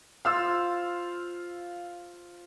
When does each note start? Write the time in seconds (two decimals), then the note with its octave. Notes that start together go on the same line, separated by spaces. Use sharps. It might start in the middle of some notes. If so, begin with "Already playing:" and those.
0.25 F4 C5 F5 E6